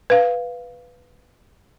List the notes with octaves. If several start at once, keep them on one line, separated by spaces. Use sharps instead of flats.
B4 F5